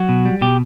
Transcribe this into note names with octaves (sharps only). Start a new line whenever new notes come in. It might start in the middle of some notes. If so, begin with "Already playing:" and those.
Already playing: F#3 F#4
B2
G3
B2 G4